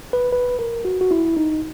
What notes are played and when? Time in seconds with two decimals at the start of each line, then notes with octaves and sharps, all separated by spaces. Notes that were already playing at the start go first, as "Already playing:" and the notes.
0.13 B4
0.33 B4
0.59 A#4
0.85 F#4
1.01 F#4
1.11 E4
1.37 D#4